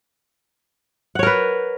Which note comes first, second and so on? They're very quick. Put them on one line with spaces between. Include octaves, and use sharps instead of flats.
F#5 C#5 A#4 B4